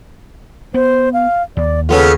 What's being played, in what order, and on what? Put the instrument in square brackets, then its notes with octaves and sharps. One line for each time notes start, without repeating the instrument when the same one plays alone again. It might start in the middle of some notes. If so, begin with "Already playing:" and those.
[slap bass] B3 [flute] C5
[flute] F5
[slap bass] D#2 [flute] D5
[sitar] C#3 B3 F4 [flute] A4